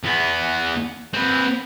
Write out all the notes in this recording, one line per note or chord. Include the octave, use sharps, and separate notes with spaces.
E2 B3
C4 B4